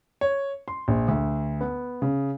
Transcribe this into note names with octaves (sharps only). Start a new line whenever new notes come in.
C#5
C6
A#1
D2
B3
C#3